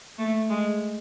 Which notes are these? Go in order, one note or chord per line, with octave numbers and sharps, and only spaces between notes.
A3
G#3